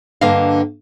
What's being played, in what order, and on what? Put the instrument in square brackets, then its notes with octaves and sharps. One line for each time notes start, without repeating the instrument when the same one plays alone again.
[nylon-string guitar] G2 D3 A#3 D#5 F5